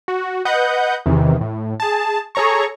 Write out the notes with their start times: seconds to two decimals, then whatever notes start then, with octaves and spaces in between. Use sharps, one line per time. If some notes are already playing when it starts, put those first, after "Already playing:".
0.08 F#4
0.45 B4 D#5 F#5 G6
1.06 E2 C3 D#3 E3
1.41 A2
1.80 G#4 A5
2.35 G#4 A4 C#5 A#5 C#6